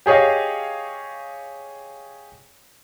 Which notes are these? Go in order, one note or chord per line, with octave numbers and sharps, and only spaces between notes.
G4 G#4 C#5 D#5 F5